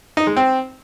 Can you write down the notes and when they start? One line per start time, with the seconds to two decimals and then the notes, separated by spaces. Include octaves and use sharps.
0.17 D#4
0.27 G#3
0.37 C4